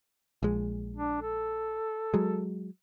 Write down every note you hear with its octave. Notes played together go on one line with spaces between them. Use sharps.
A#1 G#3
D4
A4
F#3 G#3